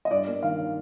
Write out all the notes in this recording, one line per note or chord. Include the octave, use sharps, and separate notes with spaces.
D#5
G2 D5
A#3
D#3 F5